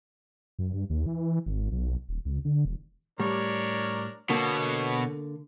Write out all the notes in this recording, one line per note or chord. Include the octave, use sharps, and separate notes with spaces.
F#2
G2
D#2
E3
G#1
B1
D#1
C#2
D3
E1
A2 G3 D4 A#4 C#5
B2 D3 A#3 A4 C#5